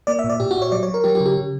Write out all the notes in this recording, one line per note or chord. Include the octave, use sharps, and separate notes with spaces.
A#3 D5
E5
A#2
D5
A#2 G4
F#4
A#2
C#5
F#3 D5
C#5
F#3
A#4
F#3 G4
G4
C#3
G4
C#3